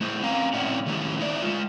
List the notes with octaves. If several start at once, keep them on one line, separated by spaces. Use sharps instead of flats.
A3 E4 C5
C4 C#4 F5 A#5
A2 C4 C#4 E4 D5 F#5
D#3 E3 G3 A3 C#4 E4
D#4 E4 C#5 D5
G#3 F4